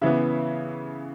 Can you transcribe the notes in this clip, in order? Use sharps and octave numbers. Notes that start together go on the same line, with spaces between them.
C#3 E3 B3 E5